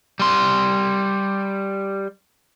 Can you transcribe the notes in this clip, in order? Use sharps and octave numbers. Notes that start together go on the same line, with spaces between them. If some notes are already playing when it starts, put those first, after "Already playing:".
G3 C6